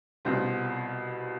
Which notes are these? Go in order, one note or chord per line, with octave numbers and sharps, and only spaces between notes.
C2 B2 G3 C4 F4